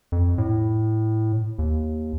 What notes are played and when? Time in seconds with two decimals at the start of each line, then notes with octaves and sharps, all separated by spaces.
0.12 F2
0.38 A2
1.59 D#2